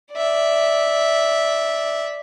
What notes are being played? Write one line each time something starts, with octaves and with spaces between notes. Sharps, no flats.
D5 E5